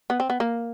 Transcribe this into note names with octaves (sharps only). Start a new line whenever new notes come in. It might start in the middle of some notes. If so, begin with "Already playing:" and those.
B3
C4
B3
A#3